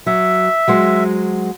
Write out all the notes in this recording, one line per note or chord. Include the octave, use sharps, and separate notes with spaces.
F#3 E5
F#3 G#3 C5